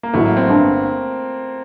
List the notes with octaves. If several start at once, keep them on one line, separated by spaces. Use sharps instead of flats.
A#3
A1 A2 F#3 A3
A#3
C4
G1 G2 D3